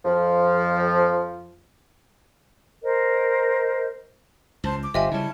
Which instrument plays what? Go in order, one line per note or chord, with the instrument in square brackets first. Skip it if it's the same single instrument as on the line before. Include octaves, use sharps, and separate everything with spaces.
[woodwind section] F2 F3
[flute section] A#4 C5 D#5
[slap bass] C#2 [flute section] C5 A5
[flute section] D6
[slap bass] G1 [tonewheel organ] F4 G4 C5 [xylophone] D#5 E5 G#5
[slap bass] C#3 G3 [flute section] C#4 A5 [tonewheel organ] E4